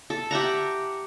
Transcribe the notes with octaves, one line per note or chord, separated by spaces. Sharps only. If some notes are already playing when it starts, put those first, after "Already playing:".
A4
G4 E5 F#5 A#5